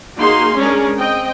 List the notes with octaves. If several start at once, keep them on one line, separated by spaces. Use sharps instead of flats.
A#3 D#4 F#4 G#4 C6
G#3 C#4 D4 G#4 A#4
C4 D#5 G5